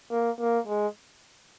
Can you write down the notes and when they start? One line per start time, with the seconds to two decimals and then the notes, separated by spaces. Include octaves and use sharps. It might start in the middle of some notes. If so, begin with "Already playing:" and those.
0.11 A#3
0.39 A#3
0.67 G#3